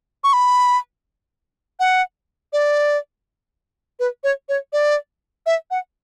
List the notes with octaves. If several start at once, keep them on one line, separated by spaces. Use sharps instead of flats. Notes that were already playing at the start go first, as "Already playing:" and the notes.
C#6
B5
F#5
D5
B4
C#5
C#5
D5
E5
F#5